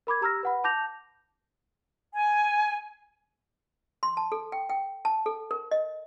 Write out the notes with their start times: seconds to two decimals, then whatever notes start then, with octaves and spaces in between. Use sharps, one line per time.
0.07 A#4 B5 D6 G#6
0.21 G4 A#5 E6 F6 A#6
0.43 B4 F#5 B5
0.64 A5 D6 G6 A#6 F7
2.14 G#5
4.03 C6
4.17 A5
4.32 A4
4.52 G5
4.69 G5
5.05 A5
5.26 A4
5.51 A#4
5.71 D#5